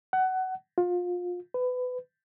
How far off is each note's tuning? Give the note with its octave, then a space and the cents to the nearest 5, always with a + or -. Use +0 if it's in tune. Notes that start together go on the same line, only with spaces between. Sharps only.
F#5 +20
F4 +25
B4 +25